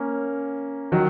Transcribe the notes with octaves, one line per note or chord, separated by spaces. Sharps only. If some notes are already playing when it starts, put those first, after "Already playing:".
Already playing: A#3 C#4
D#3 F#3